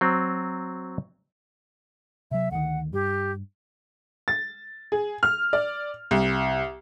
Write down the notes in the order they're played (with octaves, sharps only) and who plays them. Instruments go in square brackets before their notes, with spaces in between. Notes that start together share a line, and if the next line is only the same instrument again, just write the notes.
[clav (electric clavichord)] F#3 C4
[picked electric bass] C3 F#3 [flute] E5
[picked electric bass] D2 D#3 [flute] F#5
[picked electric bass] G2 [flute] G4
[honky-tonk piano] A6
G#4
F6
D5
C2